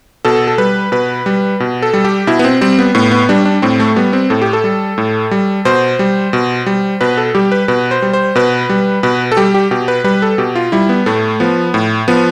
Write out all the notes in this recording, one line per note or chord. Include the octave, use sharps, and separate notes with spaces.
B2 A4
A4
G3 B4
B2 B4
G3
B2
A4
G3
G4
B2 E4
B3
C4
G3 C4
B3
A2 B3
B3
G3 D4
D4
A2 C4
A3
G3 B3
C4
A2 A4
G4
A4
G3
A2
G3
B2 C5
G3
B2
G3
B2 B4
A4
G3 G4
B4
B2 B4
C5
G3
C5
B2 B4
G3
B2 B4
A4
G3 G4
G4
B2 G4
B4
G3 B4
A4
B2 G4
F4
G3 E4
B3
A2 A3
F3 B3
A2
F3 B3